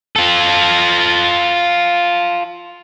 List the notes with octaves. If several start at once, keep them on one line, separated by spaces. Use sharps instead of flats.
F4 A4